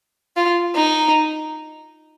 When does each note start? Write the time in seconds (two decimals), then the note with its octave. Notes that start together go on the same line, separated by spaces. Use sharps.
0.36 F4
0.75 D#4